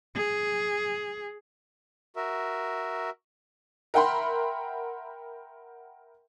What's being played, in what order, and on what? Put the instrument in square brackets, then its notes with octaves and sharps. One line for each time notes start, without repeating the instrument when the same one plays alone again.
[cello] G#4
[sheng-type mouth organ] F#4 A#4 E5
[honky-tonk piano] A#4 E5 F#5 G5 B5 C6